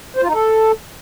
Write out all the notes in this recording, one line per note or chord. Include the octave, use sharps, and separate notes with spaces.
C5
F4
D#4
A4